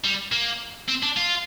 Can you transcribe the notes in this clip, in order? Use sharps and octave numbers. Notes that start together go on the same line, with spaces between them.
G3
A#3
C4
D4
F4